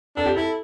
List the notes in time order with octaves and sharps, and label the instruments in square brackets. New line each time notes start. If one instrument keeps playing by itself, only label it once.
[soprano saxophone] D4 [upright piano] A4
[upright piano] G4
[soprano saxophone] E4 [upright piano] A4